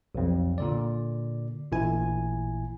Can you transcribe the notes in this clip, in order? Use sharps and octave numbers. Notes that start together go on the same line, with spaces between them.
B1 F2
A#2 D3 D5
A1 A#2 E4 G#5